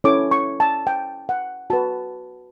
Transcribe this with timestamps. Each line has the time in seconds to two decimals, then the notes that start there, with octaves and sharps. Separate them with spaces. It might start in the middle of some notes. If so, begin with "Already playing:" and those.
0.04 C#4 E4 A4 C#5 D6
0.31 C#6
0.60 A5
0.87 G5
1.29 F#5
1.70 F#4 B4 A5